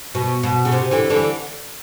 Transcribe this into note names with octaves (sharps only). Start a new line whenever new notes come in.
B2
B2
C#3
C3
D3 E3
D3 E3